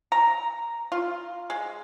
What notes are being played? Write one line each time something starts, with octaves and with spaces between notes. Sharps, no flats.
A#5
F4
G#3